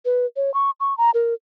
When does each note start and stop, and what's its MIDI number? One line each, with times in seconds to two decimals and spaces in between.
0.05 0.26 71
0.36 0.53 73
0.54 0.71 85
0.80 0.96 85
0.98 1.11 82
1.14 1.34 70